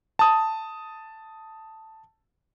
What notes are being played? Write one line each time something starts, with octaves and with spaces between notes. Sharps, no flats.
A5 D#6